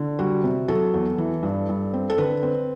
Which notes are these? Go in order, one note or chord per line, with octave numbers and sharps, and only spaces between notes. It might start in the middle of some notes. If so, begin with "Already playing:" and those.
Already playing: D3
G3 F#4
C3
F#3 A4
E2
E3
G2
G2
C4
A4
D3 B4
C4